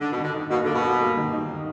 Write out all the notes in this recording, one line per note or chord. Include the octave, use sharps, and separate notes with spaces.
D3 D#3
B2
D#3
D3
D#4
B2 A#3
D3 A#3
B2
A#3
A#3
D#3
D#4
D#3